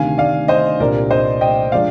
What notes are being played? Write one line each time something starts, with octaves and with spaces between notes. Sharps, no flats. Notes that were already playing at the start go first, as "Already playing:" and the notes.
Already playing: D2 C3 D#3 F5 G#5
D5 F5
C5 D#5
C2 A#2 G3 D4 A#4 D5
C5 D#5
D#5 G5
F3 G#3 D4 D5 F5